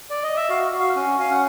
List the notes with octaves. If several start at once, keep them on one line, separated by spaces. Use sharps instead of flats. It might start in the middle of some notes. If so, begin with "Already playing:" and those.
D5
D#5
E5
F#4 F5
F#4
F5
C#4
C#4 F5
F#5